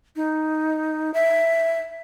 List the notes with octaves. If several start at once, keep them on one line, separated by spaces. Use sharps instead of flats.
D#4
E5